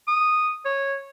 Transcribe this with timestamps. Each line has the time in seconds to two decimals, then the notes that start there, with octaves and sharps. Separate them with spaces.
0.08 D#6
0.65 C#5